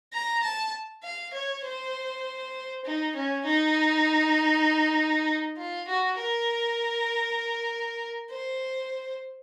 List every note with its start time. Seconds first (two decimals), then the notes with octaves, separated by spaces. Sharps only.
0.13 A#5
0.43 A5
1.04 F5
1.34 C#5
1.64 C5
2.85 D#4
3.16 C#4
3.45 D#4
5.58 F4
5.88 F#4
6.19 A#4
8.30 C5